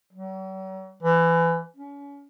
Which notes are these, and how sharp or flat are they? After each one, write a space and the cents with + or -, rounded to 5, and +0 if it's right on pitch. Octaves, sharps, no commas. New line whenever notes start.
F#3 +45
E3 +25
C#4 +35